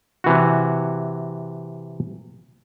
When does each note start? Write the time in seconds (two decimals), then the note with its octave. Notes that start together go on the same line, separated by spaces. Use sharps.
0.24 C3 E3 F#4